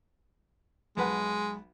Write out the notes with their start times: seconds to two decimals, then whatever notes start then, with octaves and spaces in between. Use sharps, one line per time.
0.97 B1 G#3 B4 F#5